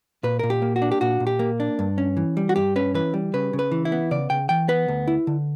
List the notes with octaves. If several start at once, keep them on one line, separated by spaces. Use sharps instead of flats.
A#2 B4
A#2 A#4
G4
A#3
F#4
D4
G4
A#2 F#4
A#2
G4
A#3
D4
G2
C#4
E3
G3
F#4
G2 G4
C#4 B4
E3 B4
G3
C#3 B4
C#3
B4
E3
E4
B3
C#3 D5
C#3 G5
E3 G5
B3 B4
D2
E4
D3